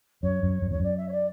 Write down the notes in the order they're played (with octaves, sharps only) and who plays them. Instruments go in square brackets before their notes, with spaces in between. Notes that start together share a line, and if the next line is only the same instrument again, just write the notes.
[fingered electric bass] F#2 [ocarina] C#5
[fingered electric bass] F#2
F#2
[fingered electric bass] E2 [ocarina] C#5
[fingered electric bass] F#2 [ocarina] D5
[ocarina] E5
C#5
D5